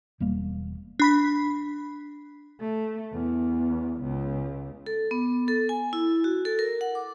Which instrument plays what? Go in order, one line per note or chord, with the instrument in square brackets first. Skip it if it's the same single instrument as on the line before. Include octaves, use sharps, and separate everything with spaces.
[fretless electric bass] E1 G3 A#3
[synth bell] D4 B5 B6
[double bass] A3
E2
C#2
[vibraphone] A4
B3
A4
G#5
E4
F#4
A4
A#4
F#5
D6